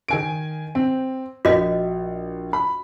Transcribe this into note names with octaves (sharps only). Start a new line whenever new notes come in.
D#3 G#5 D7
C4
A#1 F#4 D#5
B5